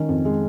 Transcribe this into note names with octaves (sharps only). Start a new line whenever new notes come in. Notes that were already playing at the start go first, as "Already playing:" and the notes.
Already playing: D#3 C#4
F2
G#3